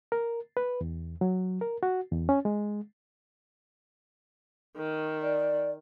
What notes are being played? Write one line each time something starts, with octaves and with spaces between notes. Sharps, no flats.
A#4
B4
E2
F#3
A#4
F#4
E2
C#4
G#3
D#3
D5